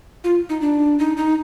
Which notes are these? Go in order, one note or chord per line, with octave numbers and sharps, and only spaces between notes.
F4
D#4
D4
D#4
D#4